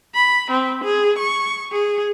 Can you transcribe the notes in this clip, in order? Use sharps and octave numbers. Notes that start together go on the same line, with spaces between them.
B5
C4
G#4
C#6
G#4